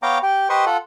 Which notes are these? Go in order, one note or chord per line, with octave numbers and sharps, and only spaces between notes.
B3 C#5 F5 G5 A#5 D6
G4 G5
G4 B4 C5 D#5 C6 C#6
F4 A4 F#5